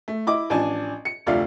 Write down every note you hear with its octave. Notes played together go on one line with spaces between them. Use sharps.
A3
E4 D#5 D6
A1 F3 D4 G#5 A5
C#7
F1 D2 A3 F4 D5 F5